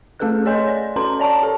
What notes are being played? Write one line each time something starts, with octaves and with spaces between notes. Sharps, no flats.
A3 C#4 G#4 A4 B4 F#6
G#4 C#5 D#5 G#5 C6 G6
D5
C#4 F#4 A4 B4 A#5 C6
C#5 D5 A5 A#5 C#6
G4 A4 A5